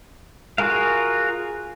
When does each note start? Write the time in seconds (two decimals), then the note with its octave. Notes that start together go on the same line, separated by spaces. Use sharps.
0.58 F4 F#4 G#4 A#4 F5